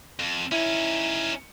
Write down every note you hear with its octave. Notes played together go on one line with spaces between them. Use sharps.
F2
C#4 D#4 E4